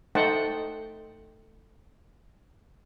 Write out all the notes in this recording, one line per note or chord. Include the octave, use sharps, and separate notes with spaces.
A3 D#4 C5 F#5 G5 A5